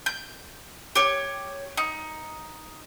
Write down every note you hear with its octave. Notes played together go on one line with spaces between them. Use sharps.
G6
G4 C#5
D#4